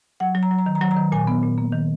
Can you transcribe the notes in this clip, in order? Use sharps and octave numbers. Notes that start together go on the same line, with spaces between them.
F#3 F#5
F#3
A#5
F#3
A#5
D#3
A#5
F#3
A#5
D#3
A#2 G#5
B3
A#2
A#3
D#3